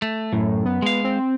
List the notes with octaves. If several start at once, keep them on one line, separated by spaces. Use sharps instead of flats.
A3
F#2 A2
B3
G#3 F5
C4